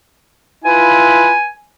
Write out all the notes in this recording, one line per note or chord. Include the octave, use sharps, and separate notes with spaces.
E4 F4 B4 G#5